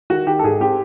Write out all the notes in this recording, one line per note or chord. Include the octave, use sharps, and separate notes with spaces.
D#3 F#4
D#3 G4
A4
G#2 G#4
C4 G4